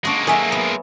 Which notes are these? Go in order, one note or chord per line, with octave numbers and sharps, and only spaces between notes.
G#3 A#3 D4 F#4
F#3 D#4 A4 E5 G#5
B3